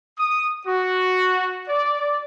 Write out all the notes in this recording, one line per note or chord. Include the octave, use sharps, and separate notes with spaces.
D#6
F#4
D5